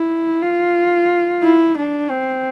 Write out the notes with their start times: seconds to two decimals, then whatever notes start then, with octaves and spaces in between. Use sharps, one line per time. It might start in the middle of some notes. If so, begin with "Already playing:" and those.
Already playing: E4
0.42 F4
1.43 E4
1.77 D4
2.10 C4